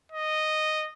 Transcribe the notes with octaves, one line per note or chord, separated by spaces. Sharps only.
D#5